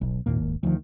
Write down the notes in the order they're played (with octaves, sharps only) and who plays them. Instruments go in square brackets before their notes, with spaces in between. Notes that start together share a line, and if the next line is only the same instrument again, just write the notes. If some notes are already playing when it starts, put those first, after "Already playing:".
[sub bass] D1 [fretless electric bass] B1
[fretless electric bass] G#1 D#2 A#3 [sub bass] A#2
[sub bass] D#1
[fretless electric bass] D2 D#3 [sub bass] F3